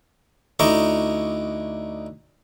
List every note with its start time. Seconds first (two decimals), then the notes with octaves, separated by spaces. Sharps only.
0.59 D2 D#4 E4 A#5 C#6 D6